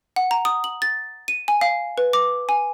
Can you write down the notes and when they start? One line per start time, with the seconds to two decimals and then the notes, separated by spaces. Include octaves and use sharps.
0.16 F#5
0.31 A#5
0.45 D#6
0.64 F#7
0.82 A6
1.28 D#7
1.48 G#5
1.61 F5
1.98 B4
2.13 D6
2.49 G#5